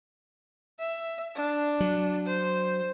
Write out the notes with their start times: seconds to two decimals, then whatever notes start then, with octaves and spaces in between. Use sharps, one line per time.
0.79 E5
1.36 D4
1.80 F#3
2.26 C5